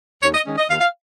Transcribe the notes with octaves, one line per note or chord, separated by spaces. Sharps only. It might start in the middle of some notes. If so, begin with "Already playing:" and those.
D#2 C#5
D#5
D#3 G#3 C#4
D#5
D#2 F5
F5